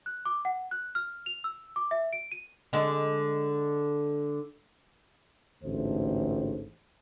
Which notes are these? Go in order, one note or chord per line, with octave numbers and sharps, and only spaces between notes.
F#6
D6
F#5
F#6
F6
F7
E6
D6
E5
D7
D#7
D3 G#3
A1 D2 G#2 A3 C5